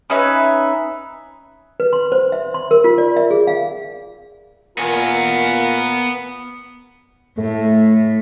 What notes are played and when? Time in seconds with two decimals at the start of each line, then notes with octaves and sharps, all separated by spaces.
0.10 C#4 D#4 B4 E5
1.80 B4
1.93 C6
2.12 C5
2.32 E5
2.54 C6
2.71 A#4
2.84 F4
2.98 D5
3.16 E5
3.31 G#4
3.47 F5
4.78 A#2 B3 F4 A#4 G#5
7.38 A2 A3